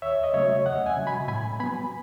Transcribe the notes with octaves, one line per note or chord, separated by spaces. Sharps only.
D#2 C#5 E5
D#5
C#3 F#3 A3 C#5 E5
D#2 D#5 F#5
E5 G#5
C#3 F#3
G#5 B5
A2 G#5 B5
F#3 B3 G#5 B5